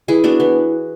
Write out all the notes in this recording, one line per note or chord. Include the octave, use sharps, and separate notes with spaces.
E3 E4 G#4
B3 D4 F#4
E3 B3